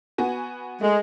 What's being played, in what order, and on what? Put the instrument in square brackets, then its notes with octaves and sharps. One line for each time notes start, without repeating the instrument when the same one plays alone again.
[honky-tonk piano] B3 F#4 G#5
[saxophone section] G#3 [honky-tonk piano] A3